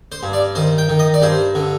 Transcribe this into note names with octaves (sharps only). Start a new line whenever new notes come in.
C5
G2
D5
D#3 C5
G5
D#3
D#5
D5
G2 C5
D3